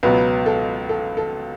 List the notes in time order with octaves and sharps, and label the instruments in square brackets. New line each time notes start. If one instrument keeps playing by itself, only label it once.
[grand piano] C#2 B2 F#3 B3 [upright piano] B4
[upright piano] A4
A4
A4